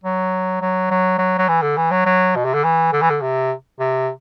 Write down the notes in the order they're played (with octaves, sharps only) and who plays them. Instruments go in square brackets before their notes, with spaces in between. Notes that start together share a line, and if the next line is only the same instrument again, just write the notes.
[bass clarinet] F#3
F#3
F#3
F#3
F#3
E3
D3
E3
F#3
F#3
B2
C3
D3
E3
D3
E3
D3
C3
C3